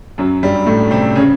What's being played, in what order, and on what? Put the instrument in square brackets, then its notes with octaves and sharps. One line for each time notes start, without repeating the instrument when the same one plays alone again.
[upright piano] F#2 F#3
G2 G3
A2 A3
C3 C4
C#3 C#4